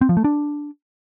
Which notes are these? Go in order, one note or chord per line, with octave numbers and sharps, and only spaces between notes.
C4
F3
A3
D4